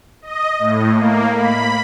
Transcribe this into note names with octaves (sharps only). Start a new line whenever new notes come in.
D#5
A2
A#3
B5